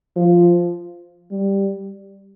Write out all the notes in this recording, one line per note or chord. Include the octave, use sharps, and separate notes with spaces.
F3
G3